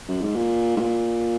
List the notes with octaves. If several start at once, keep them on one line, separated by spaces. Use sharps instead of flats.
F#2
G#2
A#2
G#2
A#2